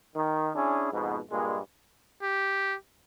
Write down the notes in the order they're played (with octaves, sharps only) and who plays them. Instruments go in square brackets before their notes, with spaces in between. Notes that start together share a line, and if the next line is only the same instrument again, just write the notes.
[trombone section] D#3
C#4 D4 E4 G#4
F2 G#2 B2
G2 A#2 G#3
[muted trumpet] G4